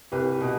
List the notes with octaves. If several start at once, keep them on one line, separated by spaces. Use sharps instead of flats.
C2 G4 B4
B2